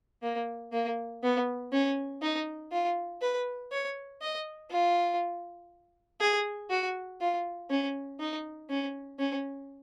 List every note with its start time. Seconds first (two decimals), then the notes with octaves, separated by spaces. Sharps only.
0.22 A#3
0.72 A#3
1.23 B3
1.73 C#4
2.22 D#4
2.72 F4
3.21 B4
3.72 C#5
4.21 D#5
4.71 F4
6.20 G#4
6.70 F#4
7.21 F4
7.70 C#4
8.20 D#4
8.70 C#4
9.19 C#4